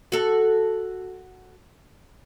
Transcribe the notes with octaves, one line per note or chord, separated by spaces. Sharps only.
F#4 A4